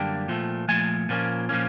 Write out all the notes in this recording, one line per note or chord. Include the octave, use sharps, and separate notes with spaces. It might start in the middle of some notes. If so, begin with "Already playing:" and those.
Already playing: F#2 D3 G3 A#3 D4 G5
A#2 F3 A3
A#2 F3 A3 G#5
A#2 F3 A#3 C#4
A#2 F3 A#3 C#4